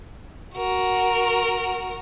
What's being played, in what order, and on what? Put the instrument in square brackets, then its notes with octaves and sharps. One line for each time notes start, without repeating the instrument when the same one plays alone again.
[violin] F#4 A#4